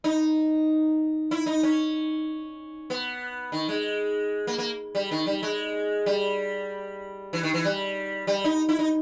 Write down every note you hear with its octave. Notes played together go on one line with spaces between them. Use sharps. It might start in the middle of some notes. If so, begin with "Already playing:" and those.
D#4
E4
D#4
C#4
B3
D#3
G#3
A#3
A#3
G3
D#3
G3
G#3
G3
E3
D#3
E3
G3
G3
D#4
E4
D#4